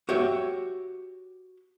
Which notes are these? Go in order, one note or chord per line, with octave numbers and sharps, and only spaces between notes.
F#4 G4 C#5 E5